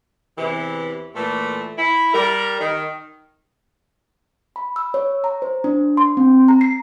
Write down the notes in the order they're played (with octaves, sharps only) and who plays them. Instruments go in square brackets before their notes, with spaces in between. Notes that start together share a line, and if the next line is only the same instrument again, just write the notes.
[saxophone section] E2 C3 E3
A#2 E3 A3
E4
G3 A#4
D#3
[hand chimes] B5
E6
C#5
A#5
C5
D4
C6
C4
A#5
C7